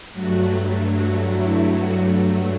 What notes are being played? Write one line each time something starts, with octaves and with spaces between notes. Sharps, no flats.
G2 F#3 A3 F#4
F#4
E4
F#4